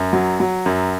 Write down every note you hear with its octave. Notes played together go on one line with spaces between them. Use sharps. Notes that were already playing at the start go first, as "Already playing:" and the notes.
Already playing: F#2
F#3
F#3
F#2